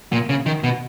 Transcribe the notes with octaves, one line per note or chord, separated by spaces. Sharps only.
A#2
C#3
D#3
B2